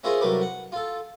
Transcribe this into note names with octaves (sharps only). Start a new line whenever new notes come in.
C#4 E4 F4 G#4 A#4 C5
C2 F#3 A3 A#4 B4 D6
F#5
F4 A4